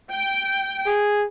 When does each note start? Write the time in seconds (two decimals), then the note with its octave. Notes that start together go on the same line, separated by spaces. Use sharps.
0.11 G5
0.86 G#4